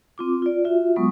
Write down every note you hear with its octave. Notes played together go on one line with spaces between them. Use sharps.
C4 F4 D6
F4 D5
F4 F#4 E5
F#3 G#3 B3 C#6 D#6